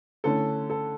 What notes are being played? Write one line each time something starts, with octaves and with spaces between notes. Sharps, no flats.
D3 A3 C#4 E4 A4
A4